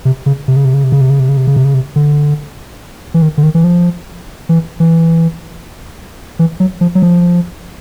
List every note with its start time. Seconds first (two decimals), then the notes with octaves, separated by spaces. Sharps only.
0.05 C3
0.26 C#3
0.48 C3
0.56 C#3
0.65 C3
0.74 C#3
0.84 C3
0.92 C#3
1.01 C3
1.10 C#3
1.20 C3
1.29 C#3
1.37 C3
1.47 C#3
1.56 C3
1.65 C#3
1.74 C3
1.96 D3
3.14 E3
3.22 D#3
3.38 D3
3.43 D#3
3.55 E3
3.64 F3
4.49 E3
4.80 E3
6.39 E3
6.60 F#3
6.81 F3
6.95 F#3
7.02 F3